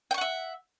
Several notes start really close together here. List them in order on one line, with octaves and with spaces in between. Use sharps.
G5 C#6 F#5 E5